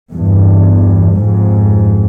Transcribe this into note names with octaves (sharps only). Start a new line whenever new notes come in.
E2 G2
F2 G#2